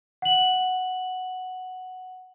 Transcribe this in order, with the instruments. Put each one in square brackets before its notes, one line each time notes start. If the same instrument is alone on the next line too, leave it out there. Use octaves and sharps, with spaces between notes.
[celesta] F#5 F#7